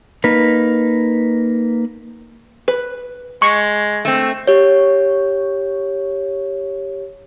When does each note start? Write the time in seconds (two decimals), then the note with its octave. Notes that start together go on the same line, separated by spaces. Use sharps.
0.24 A#3 D#4 B4
2.68 B4
3.42 G#3 C#6
4.05 A3 C4
4.47 G4 C#5